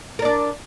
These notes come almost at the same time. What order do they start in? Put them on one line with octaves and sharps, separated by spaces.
A#4 D4 D5